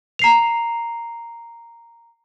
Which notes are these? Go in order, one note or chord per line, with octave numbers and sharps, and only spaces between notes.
A#5 C7 F7